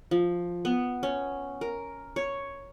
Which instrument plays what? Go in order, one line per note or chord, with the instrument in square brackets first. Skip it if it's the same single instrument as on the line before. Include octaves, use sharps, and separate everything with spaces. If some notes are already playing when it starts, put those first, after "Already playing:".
[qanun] F3
B3
C#4
A#4
C#5